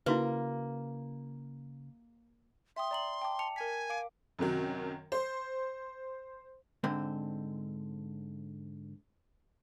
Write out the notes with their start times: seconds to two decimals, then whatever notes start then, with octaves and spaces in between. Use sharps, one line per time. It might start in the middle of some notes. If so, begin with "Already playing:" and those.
0.06 C#3 A#3 E4 F#4 B4
2.76 E5 G5 C6 D#6
2.91 D5 A#5 F#7
3.22 G5 A5 D6
3.39 A5 C#7 F7
3.56 A#4 G#5 B6
3.90 F5 D6 D7
4.39 F#2 C3 D#3 F#3
5.12 C5
6.84 G#2 D3 C4